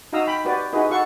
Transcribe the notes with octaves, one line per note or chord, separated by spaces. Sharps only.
D#4 F#4 F5 A#5 D#6 E6
G5 B5
F#4 G4 B4 D5
D#4 E4 F#4 G#4 B4 D#5
F#4 A4 F5 F#5 C#6